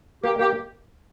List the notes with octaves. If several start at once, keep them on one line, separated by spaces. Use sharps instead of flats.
A#3 G4
A#3 G4